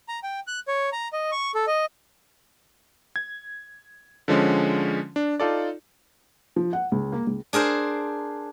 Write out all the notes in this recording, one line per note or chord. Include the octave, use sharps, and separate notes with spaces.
A#5
G5
F#6
C#5
A#5
D#5
C#6
A4
D#5
G#6
D3 F3 G#3 C#4
D4
D#4 F4 A4 D5
F3
F#5
C#2
A#3
C#2
D4 G#4 A#4 C5